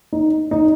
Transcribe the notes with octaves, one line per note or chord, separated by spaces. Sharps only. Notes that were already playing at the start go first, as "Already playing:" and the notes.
D#4
D#4